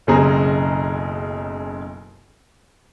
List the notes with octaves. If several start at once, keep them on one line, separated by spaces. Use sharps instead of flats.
F#1 B1 C#3 C4 G#4 A#5